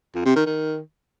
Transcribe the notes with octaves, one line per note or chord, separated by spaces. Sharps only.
F2
C3
D#3
D#3